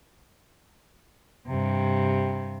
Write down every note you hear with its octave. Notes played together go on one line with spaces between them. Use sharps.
G2 C3